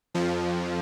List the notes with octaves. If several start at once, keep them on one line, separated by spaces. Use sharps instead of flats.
F2 F3